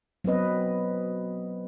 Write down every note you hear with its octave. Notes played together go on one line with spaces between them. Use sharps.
F#3 B3 C4 B4 D#5